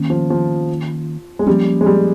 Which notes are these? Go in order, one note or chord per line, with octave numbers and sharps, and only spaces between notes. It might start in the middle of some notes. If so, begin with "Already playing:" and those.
Already playing: D#3 A#3 C#4
F3
F3
G#3
F3 G3 A#3 C#4
G#3
G3